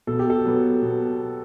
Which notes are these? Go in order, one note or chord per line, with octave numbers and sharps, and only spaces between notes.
B2 A4
G4
A4
F#3 B3
B2